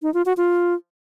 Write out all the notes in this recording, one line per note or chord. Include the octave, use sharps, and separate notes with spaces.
D#4
F4
F#4
F4